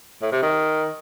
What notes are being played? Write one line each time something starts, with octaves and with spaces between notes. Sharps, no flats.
A2
C3
D#3